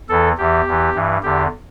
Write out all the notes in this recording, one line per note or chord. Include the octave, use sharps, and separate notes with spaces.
E2 E3 A4
E2 E3 G4
E2 E3
G2 E3
E2 D3 G4